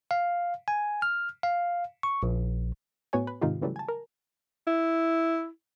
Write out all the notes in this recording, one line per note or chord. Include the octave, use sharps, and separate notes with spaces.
F5
G#5
F6
F5
C#6
A#1
A2 B3 F#4 C#5 G#5
B4
G#2 C3 D#3 D#4 F4 G4
C#3 E3 F#3 G3 A3
G#5 A5
A#4
E4